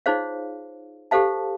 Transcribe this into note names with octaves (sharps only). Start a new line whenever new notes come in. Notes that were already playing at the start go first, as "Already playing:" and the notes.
D#4 F4 G#4 C5 C#5 F5
G4 A4 C5 F5 A5